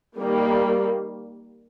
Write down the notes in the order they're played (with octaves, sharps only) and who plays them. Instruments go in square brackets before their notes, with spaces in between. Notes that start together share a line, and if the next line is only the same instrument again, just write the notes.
[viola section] D#3 G3 A#3